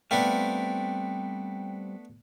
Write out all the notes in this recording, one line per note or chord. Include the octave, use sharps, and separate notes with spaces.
G3 A3 B3 C4 D4 F5 G5